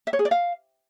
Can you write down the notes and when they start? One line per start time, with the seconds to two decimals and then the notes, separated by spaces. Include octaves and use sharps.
0.07 E5
0.13 C#5
0.19 G#4
0.25 D5
0.31 F5